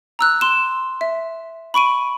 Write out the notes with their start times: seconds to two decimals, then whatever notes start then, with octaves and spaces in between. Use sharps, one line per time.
0.19 A#5 E6 F#6
0.41 C6 E7
1.01 E5
1.74 B5 C#6 D7 D#7